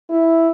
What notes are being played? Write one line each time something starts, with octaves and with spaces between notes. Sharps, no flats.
E4